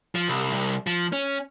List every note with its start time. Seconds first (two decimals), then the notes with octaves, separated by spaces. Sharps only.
0.15 F3
0.28 C2
0.53 C2
0.87 F3
1.13 C#4